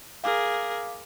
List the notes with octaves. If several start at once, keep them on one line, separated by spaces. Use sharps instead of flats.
G#4 A#4 F5 D6